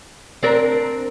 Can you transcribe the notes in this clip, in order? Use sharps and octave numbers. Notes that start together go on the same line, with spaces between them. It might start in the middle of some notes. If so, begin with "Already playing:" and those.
C4 D4 A#4